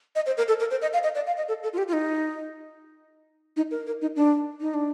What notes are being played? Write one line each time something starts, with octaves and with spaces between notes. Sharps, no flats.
D#5
C5
A#4
A4
A#4
C5
D#5
F5
D#5
D5
F5
D#5
A4
A4
F4
G4
F4
D#4
D#4
A#4
A#4
D#4
D4
D#4
D4